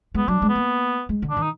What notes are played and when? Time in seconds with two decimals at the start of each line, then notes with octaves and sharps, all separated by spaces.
0.14 G#3 B3
0.28 F#3 D4
0.42 G#3
0.49 B3
0.55 A#3
1.09 G#3
1.22 D3
1.30 D4
1.37 D#3
1.42 D#4